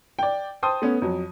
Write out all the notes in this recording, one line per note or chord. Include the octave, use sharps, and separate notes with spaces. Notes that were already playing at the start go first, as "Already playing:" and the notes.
D5 G5
C5 G5 A5 C6 D#6
A3 B3 C#4
F2 F#3